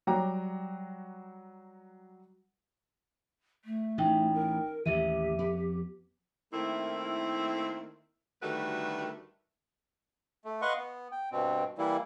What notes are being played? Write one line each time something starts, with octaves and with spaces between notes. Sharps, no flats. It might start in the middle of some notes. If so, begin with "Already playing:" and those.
F#3 G3 F#4 G5 A#5 D6
A3
A1 D#4 G5
A#4
A1 D#2 E3 G4 E5 D#7
F2 B3
D#3 A3 A#3 C4 E4
D2 D#3 G3 A3 F#4 B4
A3
B4 D#5 F5 F#5 C6 C#6
B3
G5
G2 B2 C4
E3 G3 A#3 E4